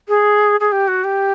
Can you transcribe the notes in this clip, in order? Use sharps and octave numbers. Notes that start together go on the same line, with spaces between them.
G#4
G#4
G4
F#4
G4